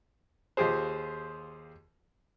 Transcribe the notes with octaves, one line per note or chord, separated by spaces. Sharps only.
D#2 F4 G4 G#4 C5